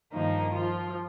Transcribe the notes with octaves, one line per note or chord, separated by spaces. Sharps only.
G2 D#3 F3 A#3 D#4
F3 F4